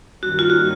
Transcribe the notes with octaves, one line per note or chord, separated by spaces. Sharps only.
G2 D#3 G3 A#3 C#4 F#4
F4
F#4